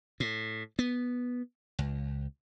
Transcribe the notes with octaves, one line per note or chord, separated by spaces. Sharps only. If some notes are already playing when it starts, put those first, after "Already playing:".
A2
B3
C#2